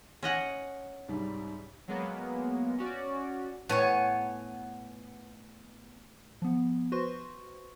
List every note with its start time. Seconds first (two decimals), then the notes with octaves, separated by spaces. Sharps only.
0.23 C#4 D#5 F#5
1.08 C2 G#2 G3
1.88 F#3 G#3 A#3 B3
2.78 C#4 F#4 D5
3.69 A2 B3 G#5 C#6
6.42 F3 B3
6.92 F#4 B4 C5 C6 C#6